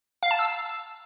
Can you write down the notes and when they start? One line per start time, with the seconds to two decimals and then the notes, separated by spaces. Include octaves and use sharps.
0.23 F5
0.31 A5
0.39 E6